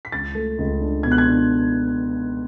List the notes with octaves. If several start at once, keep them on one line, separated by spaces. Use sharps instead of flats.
B6
C#2 A6
A3
C#2
D4
B2 G#6
F#6
G#6
D4